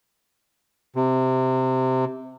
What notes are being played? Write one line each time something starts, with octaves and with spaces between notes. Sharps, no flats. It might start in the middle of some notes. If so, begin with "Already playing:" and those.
C3